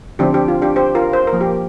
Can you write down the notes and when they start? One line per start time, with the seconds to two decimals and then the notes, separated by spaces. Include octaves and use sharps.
0.19 D3 F3 C4 D4 G4
0.34 D4 G4
0.48 F4
0.62 D4 G4
0.76 G4 C5
0.95 F4 A#4
1.13 C5
1.27 A#4
1.33 F3 A#3
1.41 G4